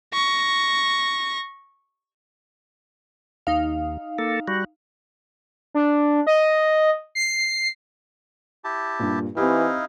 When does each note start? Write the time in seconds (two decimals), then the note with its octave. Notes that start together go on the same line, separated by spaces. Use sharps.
0.13 C#6 A#6
3.47 D#2 D#4 F5
4.18 A#3 A4
4.48 G3 F#4
5.74 D4
6.27 D#5
7.15 C7
8.64 E4 G4 A5
8.99 G2 A#2
9.37 E3 C4 D#4 E4 G4 F5